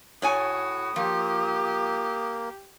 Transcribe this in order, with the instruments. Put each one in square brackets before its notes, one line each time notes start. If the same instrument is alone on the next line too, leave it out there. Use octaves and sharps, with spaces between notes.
[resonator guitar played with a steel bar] A2 C#5 G#5 [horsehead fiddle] F#4 [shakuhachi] D#6
[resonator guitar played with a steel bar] F3 [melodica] A#3 [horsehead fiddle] G4